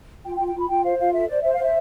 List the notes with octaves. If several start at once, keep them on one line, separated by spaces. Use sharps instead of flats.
F4 G5
G5
F4
G5
F4 B5
F4 G5
C5 F5
F4 F5
A4 E5
C5 D5
C5 E5
F5
C5 E5